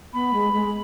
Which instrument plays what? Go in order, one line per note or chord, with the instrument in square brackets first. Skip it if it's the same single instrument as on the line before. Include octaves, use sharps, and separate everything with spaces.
[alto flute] B3 [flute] B5
[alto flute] G#3
G#3